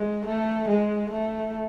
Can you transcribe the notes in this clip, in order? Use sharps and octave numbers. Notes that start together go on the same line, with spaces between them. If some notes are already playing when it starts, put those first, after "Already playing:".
Already playing: G#3
A3
G#3
A3